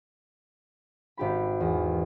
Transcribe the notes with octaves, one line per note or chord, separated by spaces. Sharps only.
G#1 G4 B5
E2